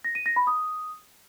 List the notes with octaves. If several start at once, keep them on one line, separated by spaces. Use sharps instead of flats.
A#6
D#7
A#6
B5
D#6